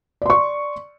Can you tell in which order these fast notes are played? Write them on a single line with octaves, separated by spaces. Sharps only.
D5 C6 C#6